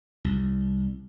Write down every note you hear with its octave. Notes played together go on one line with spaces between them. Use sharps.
C2